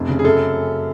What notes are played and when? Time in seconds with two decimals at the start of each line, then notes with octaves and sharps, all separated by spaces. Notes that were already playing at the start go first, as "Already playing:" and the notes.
Already playing: F1
0.08 C#3
0.19 G#4
0.24 F#2 A4